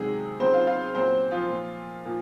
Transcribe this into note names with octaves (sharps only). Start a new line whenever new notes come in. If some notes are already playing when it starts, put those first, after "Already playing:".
Already playing: C3 D#3 F#3 G#3 G#4
C#3 F#3 C4 C5
F4 F5
F4 F5
A#2 F#3 C4 C5
F3 F4
A#2 F3
A#2 F3